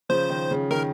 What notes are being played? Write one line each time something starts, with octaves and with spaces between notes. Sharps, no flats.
C#3 F3 C5
D#3
C#3
D#3 A#4